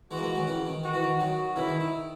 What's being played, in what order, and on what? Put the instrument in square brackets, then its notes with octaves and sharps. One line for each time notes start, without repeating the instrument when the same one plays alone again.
[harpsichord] E3 G#3 [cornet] F#4
[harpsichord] A#3
E3 G#3
D#3 F#3
C#3 E3
D#3
[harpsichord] D#3 [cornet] F#4
[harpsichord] E3
D#3
[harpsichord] D#3 F#3 [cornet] F#4
[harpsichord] C#3 E3 [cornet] E4
[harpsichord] D#3
D#3